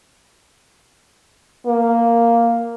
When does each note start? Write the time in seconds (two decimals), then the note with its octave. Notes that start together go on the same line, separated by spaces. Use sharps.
1.66 A#3